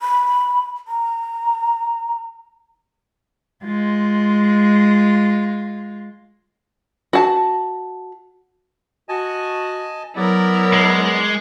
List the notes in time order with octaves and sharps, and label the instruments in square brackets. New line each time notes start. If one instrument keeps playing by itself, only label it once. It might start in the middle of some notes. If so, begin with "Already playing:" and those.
[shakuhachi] B5
A#5
[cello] G#3 F4
[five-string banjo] F#4 A5
[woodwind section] F#4 [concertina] D#5 G#5 A5
[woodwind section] F#3 [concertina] B3 D5 [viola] E4 A#4
[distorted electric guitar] G#3